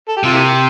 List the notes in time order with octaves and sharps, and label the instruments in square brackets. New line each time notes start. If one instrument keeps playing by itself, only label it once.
[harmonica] A4
G4
[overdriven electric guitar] C3 [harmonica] F4
[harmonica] A#3 E4 G4